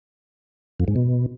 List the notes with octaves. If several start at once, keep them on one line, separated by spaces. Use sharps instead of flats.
F2
G#2
B2